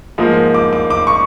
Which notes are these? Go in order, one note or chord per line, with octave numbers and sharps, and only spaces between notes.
G#2 F3 A#3
D6
D6
D6
C#6